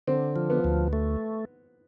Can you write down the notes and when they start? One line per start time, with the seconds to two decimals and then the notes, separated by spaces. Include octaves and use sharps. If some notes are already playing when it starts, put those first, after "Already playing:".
0.07 D3 C4
0.36 F3
0.50 B3
0.64 D2
0.93 A3